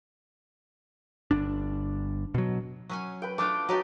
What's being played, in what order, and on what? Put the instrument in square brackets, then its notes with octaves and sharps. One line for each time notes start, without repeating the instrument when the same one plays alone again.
[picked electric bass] G1 D4
B2 F#3
[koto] F#3 C#4 G#5
[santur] B4 G5
[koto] A3 D4 F4 [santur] D6
[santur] F#3 G5 [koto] D#4 G4 D5